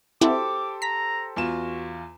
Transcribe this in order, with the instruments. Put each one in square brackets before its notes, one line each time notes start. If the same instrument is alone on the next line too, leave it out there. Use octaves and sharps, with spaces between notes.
[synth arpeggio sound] C4 E4 F#4 [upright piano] G4 A4 C5 [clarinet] D6
[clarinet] A#5 [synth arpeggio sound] B6
[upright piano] E2 F4 E7 [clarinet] F#4